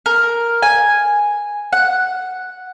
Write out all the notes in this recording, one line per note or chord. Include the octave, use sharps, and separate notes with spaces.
A#4
G#5
F#5